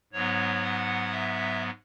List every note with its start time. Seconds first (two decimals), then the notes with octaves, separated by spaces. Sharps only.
0.13 G#2 F#3 B3 C#5
0.63 F#5
1.11 E5